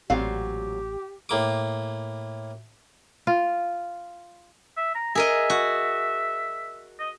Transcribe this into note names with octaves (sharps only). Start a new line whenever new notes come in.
A1 A#2 F#3 C4 G4 F5
A2 A#3 D6
F4
E5
A#5
G#4 A#4 D#5 E5
F#4
D#5